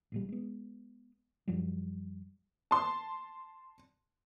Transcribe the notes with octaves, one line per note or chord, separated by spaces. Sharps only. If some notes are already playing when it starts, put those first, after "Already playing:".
A1 A#2 G3
G#3 B3
F#2 F3 G3
A5 C6